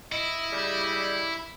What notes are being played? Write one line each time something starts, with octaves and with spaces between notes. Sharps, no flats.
E4 D#5
C#3 G3